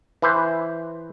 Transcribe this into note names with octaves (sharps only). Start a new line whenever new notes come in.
E3 B4 C5